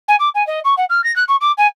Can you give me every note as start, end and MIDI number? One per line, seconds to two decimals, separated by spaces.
0.08 0.16 80
0.19 0.29 86
0.34 0.45 80
0.47 0.59 75
0.64 0.74 85
0.77 0.84 78
0.89 1.03 89
1.04 1.14 94
1.16 1.24 90
1.28 1.36 85
1.41 1.52 86
1.57 1.67 80